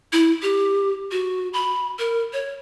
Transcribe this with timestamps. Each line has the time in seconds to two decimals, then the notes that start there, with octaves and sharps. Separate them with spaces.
0.13 E4
0.42 G4
1.11 F#4
1.53 B5
1.99 A#4
2.33 C#5